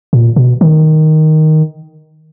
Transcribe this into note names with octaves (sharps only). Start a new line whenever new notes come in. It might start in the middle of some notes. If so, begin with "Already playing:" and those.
A#2
B2
D#3